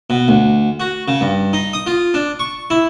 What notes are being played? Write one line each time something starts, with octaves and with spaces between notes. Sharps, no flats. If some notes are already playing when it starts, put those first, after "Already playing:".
B2
D2
F#4
C#3
G2
D#4
D#6
F4
D4
C#6
E4